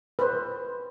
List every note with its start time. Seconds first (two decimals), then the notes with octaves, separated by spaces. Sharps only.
0.19 B4 C5